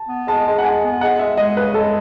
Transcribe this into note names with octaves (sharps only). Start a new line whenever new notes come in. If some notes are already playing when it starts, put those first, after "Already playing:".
Already playing: A5
B3
G#3 A5
G#3
F#5
B3 G#5
B3
G#3 F#5
G#3 E5
G#3 D#5
C#3 B4
G#3 A4